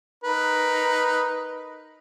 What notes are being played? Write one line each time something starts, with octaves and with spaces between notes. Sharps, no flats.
D#4 A#4 B4